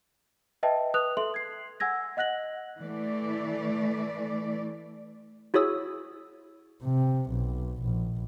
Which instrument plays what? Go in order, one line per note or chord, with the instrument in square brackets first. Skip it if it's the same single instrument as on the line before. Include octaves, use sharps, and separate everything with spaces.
[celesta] B4 D#5 E5 G5 A5
B4 D#6 F#6 F7
A4 E5 C6 F#7
G#6 C7
F#5 G#5 E6 G#6 A#6
D#5 F#5 F#6 A#6 F#7
[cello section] E3 A3 D5
[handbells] E4 F#4 G#4 C#5 D#6 E6
[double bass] C3
B1
A#1